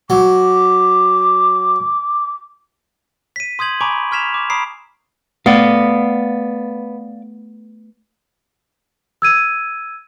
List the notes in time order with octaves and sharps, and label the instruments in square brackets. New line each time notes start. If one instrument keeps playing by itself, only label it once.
[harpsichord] F#3 [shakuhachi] D6
[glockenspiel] B6 D#7
C6 D#6 G6 G#6 F#7
G#5 A#5 B5 C#6 D6 D7
C#6 F6 G#6 B6 E7 F7
D6
A#5 B5 C#6 D#6 C7 D7
[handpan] A3 [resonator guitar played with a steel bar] B3 [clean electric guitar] D5 F5
[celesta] E6 G#6 D#7